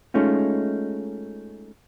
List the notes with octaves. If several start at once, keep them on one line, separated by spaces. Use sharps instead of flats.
G#3 A3 C#4 D#4 F4